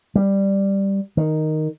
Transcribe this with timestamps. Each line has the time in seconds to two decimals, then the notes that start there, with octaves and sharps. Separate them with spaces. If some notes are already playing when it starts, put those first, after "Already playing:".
0.15 G3
1.17 D#3